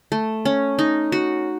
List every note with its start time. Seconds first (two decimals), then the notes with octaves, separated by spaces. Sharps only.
0.12 A3
0.45 C#4
0.79 D#4
1.12 F#4